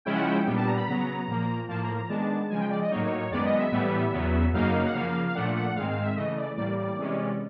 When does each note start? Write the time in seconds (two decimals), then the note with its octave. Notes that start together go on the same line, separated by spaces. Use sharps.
0.05 C#3 F3 G#3 C#4 E4 G5
0.15 F#5
0.25 G5
0.46 A#2 G3 B3 D4 G5
0.57 A5
0.67 A#5
0.77 B5
0.87 C#3 F#3 B3 A#5
1.28 A#2 F3 A#3
1.68 A2 F3 A#3 A5
1.83 A#5
1.96 A#5
2.09 D#3 G#3 B3 D4 A5
2.50 C#3 F3 G#3 G#5
2.60 G5
2.70 D5
2.81 D#5
2.91 A2 F#3 A#3 D#4 C#5
3.05 C#5
3.18 C#5
3.31 F#2 D#3 G#3 B3 D5
3.45 D#5
3.59 E5
3.72 A2 E3 G3 B3
4.13 E2 C#3 F#3 B3
4.53 F#2 C#3 F#3 A#3 D#4 F5
4.86 F#5
4.94 C#3 F3 A#3 F5
5.27 F5
5.34 A#2 F3 A3 D4 F#5
5.55 F#5
5.75 G#2 D#3 G#3 C4 F5
5.90 F5
6.02 E5
6.16 C#3 E3 A3 D#5
6.37 D5
6.57 A2 E3 G3 A#3 D5
6.78 D5
6.98 C3 E3 G#3 C#4